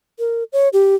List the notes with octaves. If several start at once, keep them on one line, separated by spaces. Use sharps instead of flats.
A#4
C#5
G4